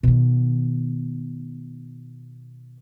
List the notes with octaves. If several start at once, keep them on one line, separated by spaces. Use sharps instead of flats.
B2 D#3